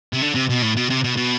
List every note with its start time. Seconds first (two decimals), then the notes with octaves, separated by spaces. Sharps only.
0.13 C3
0.21 D3
0.35 C3
0.49 B2
0.62 A2
0.76 B2
0.90 C3
1.04 B2
1.17 B2